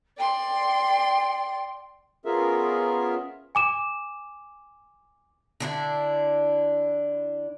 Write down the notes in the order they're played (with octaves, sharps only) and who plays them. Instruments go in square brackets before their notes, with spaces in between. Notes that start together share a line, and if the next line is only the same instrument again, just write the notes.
[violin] D5 C6 [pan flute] G5
[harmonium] B3 C#4 F4 G#4 A#4 E5
[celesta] G#5 D6 E7
[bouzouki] D3 D4 E4